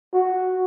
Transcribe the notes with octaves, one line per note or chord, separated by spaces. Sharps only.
F#4